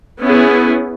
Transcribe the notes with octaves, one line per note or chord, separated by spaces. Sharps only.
B3 C#4 E4 G#4